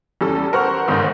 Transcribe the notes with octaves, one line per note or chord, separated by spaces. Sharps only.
E2 G3 C#4 A4
A#4 C5 F#5 C#6 F6
G1 G#2 D#3 D#6